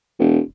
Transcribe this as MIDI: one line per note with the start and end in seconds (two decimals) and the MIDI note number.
0.19 0.40 28